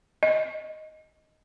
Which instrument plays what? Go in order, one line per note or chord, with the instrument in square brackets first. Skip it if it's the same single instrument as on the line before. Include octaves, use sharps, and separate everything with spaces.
[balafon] D#5